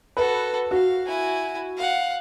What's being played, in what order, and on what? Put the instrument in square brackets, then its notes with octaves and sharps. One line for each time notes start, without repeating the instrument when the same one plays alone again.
[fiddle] F#4 A4 [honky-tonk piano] B4
[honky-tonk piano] F#4 [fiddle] F5
[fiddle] E4 G#5
F5 F#5